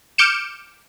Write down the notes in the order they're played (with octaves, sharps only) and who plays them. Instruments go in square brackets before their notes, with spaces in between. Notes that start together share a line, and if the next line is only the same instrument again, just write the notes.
[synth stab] D6 F6 G6 C#7 D7 E7